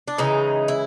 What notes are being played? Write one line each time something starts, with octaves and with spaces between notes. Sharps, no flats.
D4
C#3 E3 G#3 D#4
E4